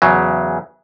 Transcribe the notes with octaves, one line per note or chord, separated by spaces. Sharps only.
E2 C#3 F#3